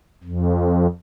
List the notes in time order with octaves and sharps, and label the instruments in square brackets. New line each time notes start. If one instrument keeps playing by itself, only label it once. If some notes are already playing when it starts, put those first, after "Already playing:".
[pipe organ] F2